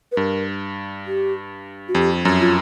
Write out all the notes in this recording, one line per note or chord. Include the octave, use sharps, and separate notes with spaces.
B4
G2 A#4
G4
F#4
F2 G4
F#2
F4